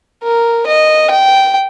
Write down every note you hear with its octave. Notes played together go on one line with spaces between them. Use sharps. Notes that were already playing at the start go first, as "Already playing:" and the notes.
A#4
D#5
G5